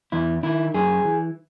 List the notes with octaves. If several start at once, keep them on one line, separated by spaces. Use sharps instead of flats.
E2 E4
D#3 E4
F#2 G#4
E3